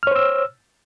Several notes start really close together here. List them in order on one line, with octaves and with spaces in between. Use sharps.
F6 C#5 C5 E6